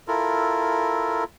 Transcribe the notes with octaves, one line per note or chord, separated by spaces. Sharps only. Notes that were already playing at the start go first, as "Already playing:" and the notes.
E4 F4 A4 A#4